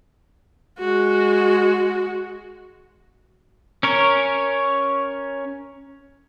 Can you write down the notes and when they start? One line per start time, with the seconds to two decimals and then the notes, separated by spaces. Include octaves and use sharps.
0.79 G#3 F#4
3.83 C#4 A#4 C#5